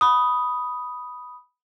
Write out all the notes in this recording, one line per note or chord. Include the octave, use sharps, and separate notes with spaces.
B5 D#6